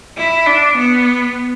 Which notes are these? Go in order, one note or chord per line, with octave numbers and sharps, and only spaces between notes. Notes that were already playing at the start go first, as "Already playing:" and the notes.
E4
D4
B3